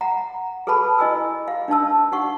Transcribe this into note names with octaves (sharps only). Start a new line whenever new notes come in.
F#5 A#5
G#4 A4 B4 A5 B5
E4 D#5 G#5 E6
F5
D4 D#4 A5 E6
D#4 F#5 C#6